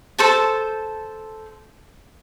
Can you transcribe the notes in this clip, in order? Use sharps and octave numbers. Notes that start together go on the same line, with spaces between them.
A4 C5 A5